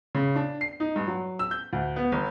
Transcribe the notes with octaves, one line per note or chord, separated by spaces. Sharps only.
C#3
D4
C7
D#4
G2
F#3
E6
G6
D2
B3
G1